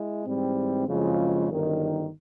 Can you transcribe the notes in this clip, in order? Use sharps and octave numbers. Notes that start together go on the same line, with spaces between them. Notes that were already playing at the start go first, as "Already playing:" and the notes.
Already playing: G#3 E4
G#2 E3 G3 C4
F#1 F2 C#3 F3 G#3
G1 F#2 D#3